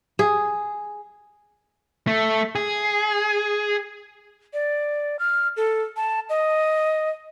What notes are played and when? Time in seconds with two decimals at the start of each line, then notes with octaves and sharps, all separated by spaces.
0.19 G#4
2.07 A3
2.55 G#4
4.53 D5
5.19 F6
5.57 A4
5.96 A5
6.29 D#5